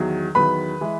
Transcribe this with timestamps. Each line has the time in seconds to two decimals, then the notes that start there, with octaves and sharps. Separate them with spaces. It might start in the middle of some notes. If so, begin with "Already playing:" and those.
Already playing: E2 D#3 F#3
0.35 E2 D#3 F#3 B4 B5
0.81 E3 G#3